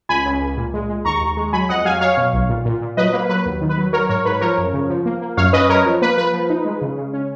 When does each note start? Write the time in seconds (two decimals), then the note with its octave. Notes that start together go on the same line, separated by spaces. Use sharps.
0.09 C#2 G#5 B5
0.25 C#2
0.41 C#2
0.57 A#2
0.74 G#3
0.89 G#3
1.05 D#2 A#5 C#6
1.21 D#2
1.37 G#3
1.53 F#3 G#5 B5
1.69 F2 D#5 F#5
1.85 F#3 F5 G#5
2.01 F#3 C#5 F5
2.17 B2
2.33 B1
2.49 A#2
2.65 A#2
2.81 A#2
2.97 F#3 B4 D#5
3.13 A#3 B4
3.29 F#3 B4
3.45 D#2
3.61 D#3
3.69 B4
3.78 F#3
3.93 F#3 A#4 C#5
4.09 G#2 A#4 C#5
4.25 G#2 B4
4.41 F3 A#4 C#5
4.58 F#2
4.73 C#3
4.89 F3
5.06 A#3
5.22 A#3
5.37 F#2 C#5 F5
5.53 C#4 B4 D#5
5.69 F#2 A#4 C#5
5.85 F3
6.02 A#3 B4
6.17 F3 B4
6.34 F3
6.50 D#4
6.65 G#3
6.81 C#3
6.97 C#3
7.13 C#4